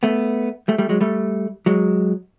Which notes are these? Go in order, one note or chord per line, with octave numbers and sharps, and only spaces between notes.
A3 B3
G3 A3
G3 A3
F#3 G#3
G3 A3
F#3 G#3